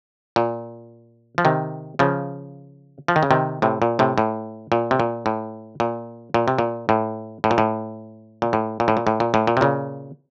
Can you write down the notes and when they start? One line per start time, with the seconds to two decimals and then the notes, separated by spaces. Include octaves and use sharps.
0.36 A#2
1.38 F3
1.45 C3 D#3
1.99 C#3 F3
3.08 F3
3.16 D#3
3.23 C#3
3.31 C3 D#3
3.62 A2 C3
3.82 A#2
3.99 A2 C3
4.18 A2
4.72 A#2
4.91 C3
5.00 A#2
5.26 A2
5.80 A#2
6.34 A#2
6.48 C3
6.59 A#2
6.89 A2
7.44 A2
7.51 A#2
7.58 A2
8.42 A#2
8.53 A2
8.80 A#2
8.88 A2
8.97 A#2
9.07 A2
9.20 A#2
9.34 A2
9.47 A#2
9.57 C3
9.61 A#2 C#3